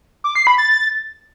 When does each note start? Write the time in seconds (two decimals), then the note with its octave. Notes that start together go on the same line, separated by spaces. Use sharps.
0.24 D6
0.35 C7
0.47 B5
0.58 A6